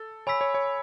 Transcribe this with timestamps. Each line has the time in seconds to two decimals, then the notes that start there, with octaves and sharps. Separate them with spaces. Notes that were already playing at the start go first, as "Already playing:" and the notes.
Already playing: A4
0.27 C#5 G#5 B5 E6 B6
0.41 C#5
0.54 C#5